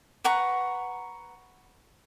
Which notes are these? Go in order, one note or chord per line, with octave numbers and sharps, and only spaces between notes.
B4 F#5 A#5 C#6